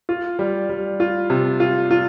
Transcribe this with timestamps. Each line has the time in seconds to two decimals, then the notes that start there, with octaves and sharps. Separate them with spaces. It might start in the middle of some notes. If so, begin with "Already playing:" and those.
0.09 F4
0.39 G3
0.69 G3
1.00 F4
1.30 C3
1.60 F4
1.91 F4